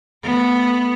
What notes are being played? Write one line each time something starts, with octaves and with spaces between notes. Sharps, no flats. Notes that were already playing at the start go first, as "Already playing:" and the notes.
A3 B3